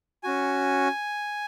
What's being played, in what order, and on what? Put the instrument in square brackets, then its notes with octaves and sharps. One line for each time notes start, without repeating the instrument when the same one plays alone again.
[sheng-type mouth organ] C#4 F#4 G#5